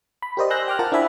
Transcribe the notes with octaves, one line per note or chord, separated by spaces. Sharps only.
B5
G4 A#4 C5 D5 D#5
G#5 C6 E6 F#6 G6 A#6
G5 D6 F6 F#6
F4 A#4 F#5 A5
D4 E4 C5 E5 G#5 B5